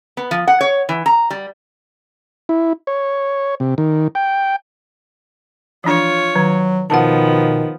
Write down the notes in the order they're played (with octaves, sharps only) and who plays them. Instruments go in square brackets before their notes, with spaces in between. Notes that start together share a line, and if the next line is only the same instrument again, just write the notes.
[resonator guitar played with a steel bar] B3
F3
F#5
C#5
E3
A#5
G3
[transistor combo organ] E4
C#5
C3
D#3
G5
[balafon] E3 F3 D4 [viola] F4 C#5
[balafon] D#3 [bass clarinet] F#3
[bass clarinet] B2 [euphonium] D#3 [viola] F3 B3 [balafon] F#5 A5